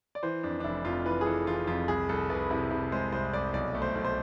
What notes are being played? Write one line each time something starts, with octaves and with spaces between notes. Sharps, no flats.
D5
E3 C5
F2 D4
D4
F1 E4
F2 F4
E3 B4
G#4
E3 A4
E3 F4
F2 F4
C2 G#4
C2 A4
C2 B4
C3 E4
C3 E4
G#3 C5
C2 C5
C2 D5
B1 D5
A3
C5
B1
C5